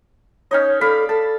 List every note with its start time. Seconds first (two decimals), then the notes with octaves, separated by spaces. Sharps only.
0.51 C#4 D#4 C#5 D#5
0.81 A4 D5 F5 B5
1.09 A4 A5